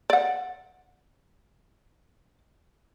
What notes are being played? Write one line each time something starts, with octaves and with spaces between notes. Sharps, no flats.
D5 F#5